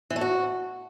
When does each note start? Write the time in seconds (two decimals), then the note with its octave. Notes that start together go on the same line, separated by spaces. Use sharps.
0.10 E3
0.16 A3
0.21 F#4